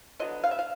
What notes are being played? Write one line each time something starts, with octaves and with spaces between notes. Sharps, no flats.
D3 F#3 B3 D#5
F5
E5
F5